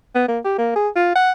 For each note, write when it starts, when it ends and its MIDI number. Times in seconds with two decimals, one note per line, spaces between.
0.15 0.26 59
0.28 0.39 58
0.45 0.57 67
0.58 0.75 58
0.76 0.89 68
0.96 1.15 65
1.15 1.32 78